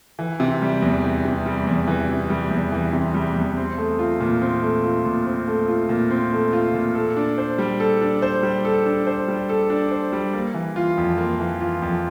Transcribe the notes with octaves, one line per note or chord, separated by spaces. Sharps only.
E3
C3
G3
E2
E3
C3
G3
E2
E3
C3
G3
E2
E3
C3
G3
E2
C4
A3
F4
A#2
C4
A3
F4
A#2
C4
A3
F4
A#2
C4
A3
F4
A#2
A4
D4
C5
G3
A4
D4
C5
G3
A4
D4
C5
G3
A4
D4
C5
G3
A#3
E3
F4
F2
A#3
E3
F4
F2